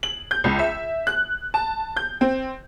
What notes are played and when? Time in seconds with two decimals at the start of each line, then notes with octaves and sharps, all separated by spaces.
0.03 F#7
0.31 G6
0.44 C#2
0.59 E5
1.07 F#6
1.54 A5
1.97 G6
2.21 C4